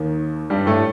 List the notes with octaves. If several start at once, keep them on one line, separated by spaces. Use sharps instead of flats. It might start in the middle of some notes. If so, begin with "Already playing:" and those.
Already playing: D#2 D#3
G2 G3
A2 A3